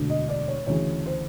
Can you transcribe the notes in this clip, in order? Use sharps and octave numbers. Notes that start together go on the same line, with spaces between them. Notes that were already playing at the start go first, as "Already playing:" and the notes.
Already playing: E1 D2 D3
D#5
D5
C#5
D2 C#3 E3 C#5
C5